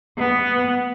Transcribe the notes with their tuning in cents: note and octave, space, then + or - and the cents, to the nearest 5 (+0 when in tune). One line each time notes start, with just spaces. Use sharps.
B3 +0